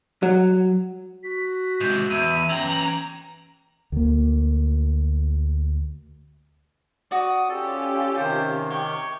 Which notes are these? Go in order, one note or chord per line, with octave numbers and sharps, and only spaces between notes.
F#3
F#4 B6
G#2 C3 G6
E2 E5 D#7
E3 C#4 G5 A#5 F#7
D2 A#3
F#4 D5 D#6
C#4 F4 G4 A4
C3 D#3 C5
G4 C#5